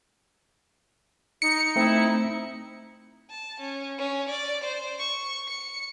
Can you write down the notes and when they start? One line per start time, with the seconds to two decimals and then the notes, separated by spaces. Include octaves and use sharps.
1.42 D#4 C#7
1.76 A3 C4 E4
3.30 A5
3.61 C#4
3.98 C#4
4.29 D5
4.64 C5
4.99 C#6
5.48 C#7